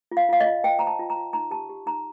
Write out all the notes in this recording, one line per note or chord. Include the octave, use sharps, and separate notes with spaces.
F4
F5
F4 F5
D#5
F4
C5 G5
C5 A#5
A5
F4
A#5
F4
D#4 A#5
G4 A5
G4
D#4 A#5